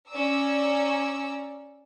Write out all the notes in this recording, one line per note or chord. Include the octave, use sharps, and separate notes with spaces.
C#4 D5 A#5 E6